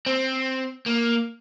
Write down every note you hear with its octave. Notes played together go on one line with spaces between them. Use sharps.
C4
A#3